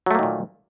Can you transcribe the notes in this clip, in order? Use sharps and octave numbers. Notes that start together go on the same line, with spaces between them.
A#2 D#3 F#3 A3 A#3